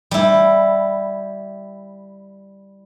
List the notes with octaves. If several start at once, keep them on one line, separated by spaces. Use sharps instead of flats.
G3 E4